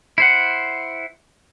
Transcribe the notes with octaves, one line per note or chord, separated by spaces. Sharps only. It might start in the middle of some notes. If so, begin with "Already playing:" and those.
E4 C5 F#5